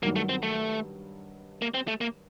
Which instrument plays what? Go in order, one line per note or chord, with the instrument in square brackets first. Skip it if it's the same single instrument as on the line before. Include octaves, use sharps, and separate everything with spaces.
[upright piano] G2 D#3 F#3 [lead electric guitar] A#3
[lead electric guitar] A3
C4
A3
A#3
C4
A3
A#3